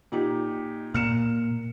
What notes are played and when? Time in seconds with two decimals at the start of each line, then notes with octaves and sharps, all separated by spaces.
0.12 A#2 D#4 G4
0.94 A#2 F6 C#7 E7